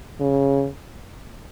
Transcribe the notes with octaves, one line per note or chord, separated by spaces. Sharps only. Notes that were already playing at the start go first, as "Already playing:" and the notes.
C#3